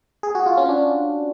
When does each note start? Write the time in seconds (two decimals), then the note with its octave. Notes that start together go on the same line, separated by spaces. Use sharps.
0.23 G#4
0.35 F#4
0.46 F4
0.57 C#4
0.69 D4